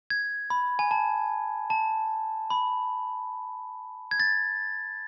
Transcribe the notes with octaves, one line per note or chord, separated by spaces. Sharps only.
G#6
B5
G#5
A5
A5
B5
G#6
A6